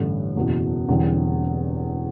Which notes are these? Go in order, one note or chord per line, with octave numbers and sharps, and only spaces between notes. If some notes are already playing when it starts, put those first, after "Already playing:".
Already playing: A1 G2 D3 A3
F#1 E2 B2
E1 E2 D3 G3 C4